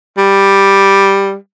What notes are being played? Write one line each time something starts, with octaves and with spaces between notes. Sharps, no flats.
G3